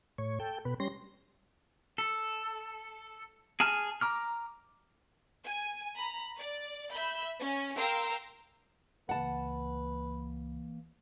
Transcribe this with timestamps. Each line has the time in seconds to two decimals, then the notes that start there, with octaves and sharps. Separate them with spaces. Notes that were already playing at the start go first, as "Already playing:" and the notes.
0.18 A2 C#5
0.40 A4 G5
0.65 B2 B4
0.80 G3 C#4 C6 A#6
1.98 A4
3.60 G#4 G#5 A5 F6
4.01 A#5 D6 F6
5.44 G#5
5.97 A#5 B5
6.38 D5
6.92 E5 B5 G6
7.41 C#4
7.75 A#4 F5 G5 A#5 C6 E6
9.09 C#2 E3 A#3 B4 F#5 A5